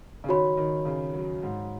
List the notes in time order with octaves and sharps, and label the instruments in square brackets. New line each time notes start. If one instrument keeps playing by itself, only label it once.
[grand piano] C#3
[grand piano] D#3 [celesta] F#4 C#5 B5
[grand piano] D#3
C#3
F#3
G#2